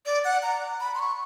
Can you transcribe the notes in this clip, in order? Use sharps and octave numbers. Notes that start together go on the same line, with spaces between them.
D5
F#5
A#5
B5
C6
C#6